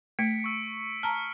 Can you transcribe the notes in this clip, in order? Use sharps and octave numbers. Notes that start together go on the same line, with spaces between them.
A3 B6 C#7 D7
C#6 E6
A5 A#5 F6